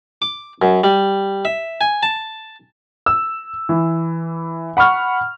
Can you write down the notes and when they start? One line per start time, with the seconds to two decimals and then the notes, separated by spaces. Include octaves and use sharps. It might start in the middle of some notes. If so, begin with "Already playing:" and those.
0.22 D6
0.62 F#2
0.84 G3
1.45 E5
1.81 G#5
2.03 A5
3.06 E6
3.69 E3
4.77 F#5 B5 C#6 F6